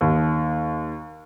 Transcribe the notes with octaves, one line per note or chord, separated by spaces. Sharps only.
D#2